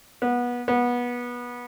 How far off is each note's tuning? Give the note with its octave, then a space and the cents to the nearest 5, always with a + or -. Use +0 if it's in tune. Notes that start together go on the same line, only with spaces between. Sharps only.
B3 -20
B3 -20